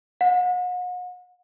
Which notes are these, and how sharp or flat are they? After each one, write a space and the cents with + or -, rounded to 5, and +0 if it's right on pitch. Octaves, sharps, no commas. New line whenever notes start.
F#5 -40